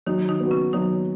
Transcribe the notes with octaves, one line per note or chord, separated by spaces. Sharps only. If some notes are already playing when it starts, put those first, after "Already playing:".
D#3 F#3 D#4
D#3 D#4
B3 F#4
C#3 C#4
D#3 F#3 D#4